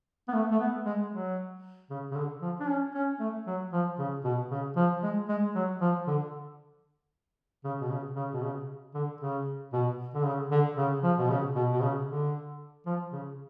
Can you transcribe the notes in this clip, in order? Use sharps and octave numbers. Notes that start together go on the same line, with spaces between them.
B3
A3
A3
B3
G#3
F#3
C#3
C#3
D3
F3
D4
C#4
C#4
A3
F#3
F3
C#3
B2
C#3
F3
G#3
G#3
F#3
F3
D3
C#3
B2
C#3
C#3
B2
C#3
D3
C#3
B2
D3
C#3
D3
C#3
F3
B2
C#3
B2
B2
C#3
D3
F3
C#3